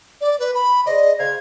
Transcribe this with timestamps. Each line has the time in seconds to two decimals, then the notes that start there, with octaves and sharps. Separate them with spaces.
0.21 D5
0.39 B4
0.54 B5
0.86 G#4 C5 D5 D#5
1.19 C#3 C5 F5 G#6